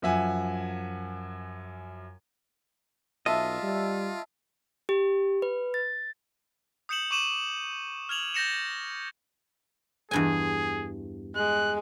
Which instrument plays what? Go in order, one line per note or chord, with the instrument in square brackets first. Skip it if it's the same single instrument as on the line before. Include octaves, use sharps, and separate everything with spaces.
[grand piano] F#2 F3 E5 F#5 G#5
[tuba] B1 [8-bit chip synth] F4 [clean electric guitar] D#5 [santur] E5 A5
[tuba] G3
[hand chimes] G4
B4
A6
[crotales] D#6 G6 C#7 E7 F#7
C#6 D6 D#7 E7 F#7
F6 G#6 F7 F#7
G6 A6 A#6 C#7 E7
[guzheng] E2 G2 G#5 [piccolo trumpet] G#4
[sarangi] G#3 [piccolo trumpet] F#6